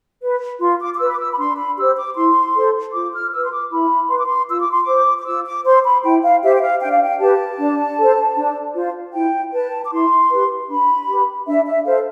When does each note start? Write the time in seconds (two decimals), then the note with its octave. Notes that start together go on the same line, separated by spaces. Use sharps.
0.22 B4
0.60 F4 C6
0.81 D6
0.94 D6
0.99 B4 E6
1.12 D6
1.19 E6
1.32 B5
1.38 D4 C6
1.57 B5
1.77 G4 C5 E6
1.96 D6
2.15 E4 C6
2.55 A4 C5
2.93 F4 D6
3.12 F6
3.32 B4 E6
3.43 C6
3.51 D6
3.70 E4 B5
4.09 B4 C6
4.17 D6
4.25 C6
4.49 F4 E6
4.60 D6
4.70 C6
4.82 D6
4.87 C5
5.18 D6
5.26 F4 E6
5.46 D6
5.64 C5 C6
5.83 B5
6.03 E4 G5
6.23 F5
6.42 G4 C5 E5
6.54 G5
6.61 F5
6.81 D4 G5
6.91 F5
7.01 G5
7.19 G4 B4 A5
7.58 D4
7.98 A4 C5
8.36 D4
8.75 F4 C5
9.13 E4 G5
9.53 B4 A5
9.85 D6
9.91 E4 C6
10.30 G4 B4
10.69 D4 B5
11.07 G4
11.12 B4
11.47 D4 E5
11.66 E5
11.85 A4 C5 F5